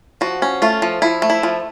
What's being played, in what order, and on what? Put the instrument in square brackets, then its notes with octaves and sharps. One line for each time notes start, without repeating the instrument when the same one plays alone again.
[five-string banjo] F3 F#4
C#4
A3 F4
F3
F3 E4
A3
E4
F3